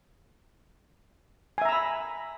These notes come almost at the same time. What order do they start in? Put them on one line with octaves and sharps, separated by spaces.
G#5 E5 A#5 E6 B5